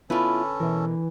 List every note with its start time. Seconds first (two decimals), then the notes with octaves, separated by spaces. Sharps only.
0.10 D3 B3 C#4 E4 F4 A4 B4
0.60 B2 E3 A#4